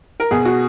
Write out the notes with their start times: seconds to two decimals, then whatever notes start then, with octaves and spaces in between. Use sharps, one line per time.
0.20 A#4
0.31 B2 G#4
0.45 F#4